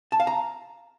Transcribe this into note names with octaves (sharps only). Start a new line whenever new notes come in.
A5
F5
A#5